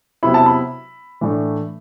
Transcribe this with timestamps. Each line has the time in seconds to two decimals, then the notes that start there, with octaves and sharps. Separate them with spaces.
0.23 C3 F#3 B3 E4 B5
0.34 A5
0.46 B5
1.21 A2 E3 A3 D4